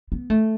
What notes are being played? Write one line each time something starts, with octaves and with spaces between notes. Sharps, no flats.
B3
A3